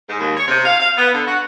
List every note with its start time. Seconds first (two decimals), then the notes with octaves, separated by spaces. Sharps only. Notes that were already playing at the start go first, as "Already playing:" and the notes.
0.08 G#2
0.20 D#2
0.36 C#5
0.48 C3
0.64 F5
0.78 F5
0.97 B3
1.13 D3
1.26 F#4